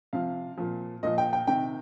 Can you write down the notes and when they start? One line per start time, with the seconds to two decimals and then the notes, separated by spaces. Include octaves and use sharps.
0.13 C3 F3 F5
0.57 A#2 F3
1.03 A#2 F3 D#5
1.18 G5
1.33 G5
1.47 C3 D#3 G5